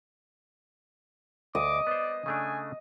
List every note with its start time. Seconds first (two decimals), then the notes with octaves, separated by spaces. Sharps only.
1.55 D2 D#5 D6
1.87 B3 C5 D5
2.26 C#3 A3 D4 G#5